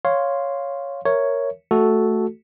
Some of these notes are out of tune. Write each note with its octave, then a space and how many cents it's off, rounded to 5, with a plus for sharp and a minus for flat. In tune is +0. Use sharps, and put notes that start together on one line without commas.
C#5 +0 F5 +0 C6 +0
A#4 +0 C#5 +0 E5 +0
A3 +0 F#4 +0 A4 -5